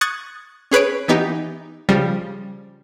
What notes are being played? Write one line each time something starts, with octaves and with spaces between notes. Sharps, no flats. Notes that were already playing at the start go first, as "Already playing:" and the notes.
C#6 D#6 F#6 G#6 A6
C#4 G#4 B4 C#5 D7
E3 B3 D#4 G4
C#3 F3 G3